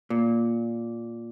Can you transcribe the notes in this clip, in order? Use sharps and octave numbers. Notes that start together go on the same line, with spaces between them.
A#2